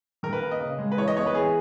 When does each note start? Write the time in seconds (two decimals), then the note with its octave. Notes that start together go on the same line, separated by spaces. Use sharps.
0.23 D#3 A#4
0.33 B4
0.42 A#3
0.51 D#5
0.60 C#3
0.79 G#3
0.92 B4
0.98 E3 C#5
1.08 D#5
1.17 B3 C#5
1.26 B4
1.35 E3 G#4